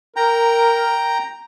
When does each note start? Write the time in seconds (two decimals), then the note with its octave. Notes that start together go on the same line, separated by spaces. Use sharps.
0.16 A#4 G5 A#5